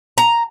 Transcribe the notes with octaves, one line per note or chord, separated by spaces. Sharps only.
A#5